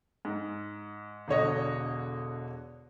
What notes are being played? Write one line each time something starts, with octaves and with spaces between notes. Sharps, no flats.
G#2
E1 D3 C#5 D#5